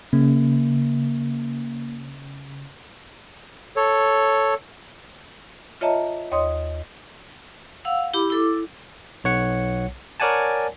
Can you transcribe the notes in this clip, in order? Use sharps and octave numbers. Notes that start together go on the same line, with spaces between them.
C#3 A#3
A4 C#5
F4 C#5 D#5 E5 A5 A#5
D#2 C#5 D#5 C6 D#6
F5 F#5 E6
E4 G4 B5 D6
E4 A4 D6
B1 C#5 F#5 C#7
A#4 C#5 D5 F#5 G#5 A5